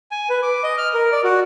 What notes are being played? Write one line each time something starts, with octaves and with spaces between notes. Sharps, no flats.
G#5
B4
D6
D#5
F6
A#4
D5
F#4